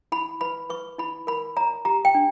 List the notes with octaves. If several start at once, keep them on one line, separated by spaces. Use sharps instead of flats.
E4 B5
B4 B5
B4 C#6
E4 B5
A#4 B5
C#5 A#5
G4 A#5
G5
D4